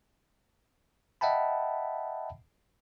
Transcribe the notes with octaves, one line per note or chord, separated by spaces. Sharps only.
D#5 E5 F#5 G5 A5 B5